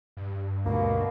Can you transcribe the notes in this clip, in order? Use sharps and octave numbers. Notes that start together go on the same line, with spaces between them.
G2
D2 B2 D3 A#3